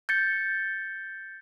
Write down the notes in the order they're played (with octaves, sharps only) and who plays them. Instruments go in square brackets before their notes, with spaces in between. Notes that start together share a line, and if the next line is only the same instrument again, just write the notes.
[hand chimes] G6 A6 C#7